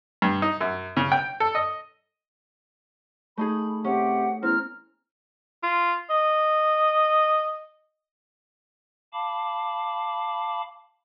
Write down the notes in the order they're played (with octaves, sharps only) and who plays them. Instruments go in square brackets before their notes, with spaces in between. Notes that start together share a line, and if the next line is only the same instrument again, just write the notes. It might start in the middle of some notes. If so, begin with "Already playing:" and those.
[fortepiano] G2
D#4
F#2
C#3
G5
A4
D#5
[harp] A3 D#4 G#4 [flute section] B5
[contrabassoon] C3 [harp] C#4 [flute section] G4 F#5
[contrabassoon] E2 [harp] C4 [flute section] C#4 A#5 F6
[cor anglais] F4
D#5
[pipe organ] F5 A5 B5 D6